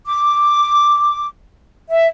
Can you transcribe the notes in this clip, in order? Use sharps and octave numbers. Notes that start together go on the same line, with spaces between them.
D6
E5